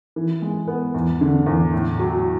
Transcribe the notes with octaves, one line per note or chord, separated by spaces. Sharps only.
E3
G#3
B3
E2
D3
E2
A2
F#3